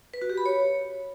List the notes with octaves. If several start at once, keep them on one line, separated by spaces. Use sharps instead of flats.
B4
F#4
G4
B5
C#5